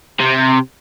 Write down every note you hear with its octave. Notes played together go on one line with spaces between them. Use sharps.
C3